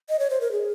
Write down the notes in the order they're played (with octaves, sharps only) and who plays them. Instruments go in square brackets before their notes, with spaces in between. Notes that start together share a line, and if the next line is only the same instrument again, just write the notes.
[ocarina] D#5
C#5
C5
A#4
G#4